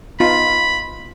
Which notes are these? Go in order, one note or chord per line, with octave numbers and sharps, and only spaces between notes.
B3 D#4 F4 B5